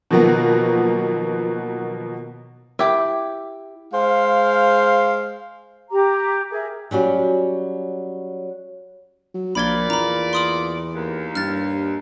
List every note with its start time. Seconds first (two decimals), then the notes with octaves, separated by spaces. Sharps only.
0.11 B2 D#3 F3 F#3 A#3 B3
2.79 E4 G4
3.93 G#3 C5 F5
5.91 G4 A#5 D6
6.51 G#4 A#4 E5
6.91 F#3 G3 C#4 F#4
9.34 F#3
9.55 A#1 A#2 D5 B5 G#6 G7
9.90 E2 A#5 B5
10.33 C6 D#6 F#7
10.93 D#2
11.35 G2 F6 A6